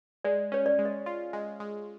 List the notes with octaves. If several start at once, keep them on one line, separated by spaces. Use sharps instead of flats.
G#3 D5
C#4 C#5
D5
G#3
D#5
F4
G#3
G#3